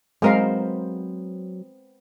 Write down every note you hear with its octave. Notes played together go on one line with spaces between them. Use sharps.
F#3 G#3 B3 C4 A#4 C5 F5